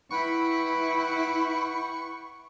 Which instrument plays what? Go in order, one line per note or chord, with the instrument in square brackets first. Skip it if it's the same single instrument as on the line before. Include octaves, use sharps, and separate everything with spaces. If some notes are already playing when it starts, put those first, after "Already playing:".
[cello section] E4 [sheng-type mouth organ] B4 F#5 G5 [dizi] B5 [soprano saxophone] C#6